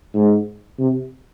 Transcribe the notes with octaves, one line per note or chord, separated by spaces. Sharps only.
G#2
C3